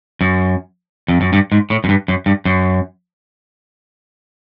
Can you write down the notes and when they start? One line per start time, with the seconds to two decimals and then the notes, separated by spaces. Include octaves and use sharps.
0.21 F#2
1.08 F2
1.21 F#2
1.33 G2
1.52 G#2
1.70 A2
1.84 F#2
1.89 G2
2.08 F#2
2.26 G2
2.45 F#2